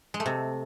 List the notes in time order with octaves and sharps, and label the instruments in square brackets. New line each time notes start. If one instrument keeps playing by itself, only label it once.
[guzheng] G#3
A3
C3